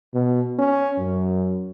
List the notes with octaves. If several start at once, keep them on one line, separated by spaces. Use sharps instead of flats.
B2
C#4
F#2